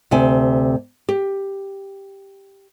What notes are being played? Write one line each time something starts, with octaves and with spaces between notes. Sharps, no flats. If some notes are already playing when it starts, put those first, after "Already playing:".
D2 C3 G#5
G4